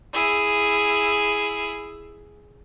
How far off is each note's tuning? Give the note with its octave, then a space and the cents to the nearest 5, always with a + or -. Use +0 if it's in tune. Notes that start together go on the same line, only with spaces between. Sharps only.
E4 +10 G#4 +0